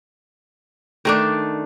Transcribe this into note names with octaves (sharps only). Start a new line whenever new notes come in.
D#3 A3 D4